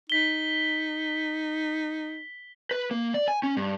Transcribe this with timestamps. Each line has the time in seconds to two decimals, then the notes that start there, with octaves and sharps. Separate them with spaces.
0.10 D#4 B6 G7
2.71 B4
2.91 A#3
3.14 D5
3.28 G#5
3.43 C#4
3.57 G2